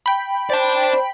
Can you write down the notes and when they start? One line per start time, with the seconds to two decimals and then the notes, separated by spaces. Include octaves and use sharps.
0.06 G5 B5
0.50 C5 D5 A5